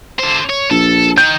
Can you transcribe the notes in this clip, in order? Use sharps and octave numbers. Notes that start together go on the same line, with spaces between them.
D3 C5
C#5
A#1 A4
D#3 D#4 G6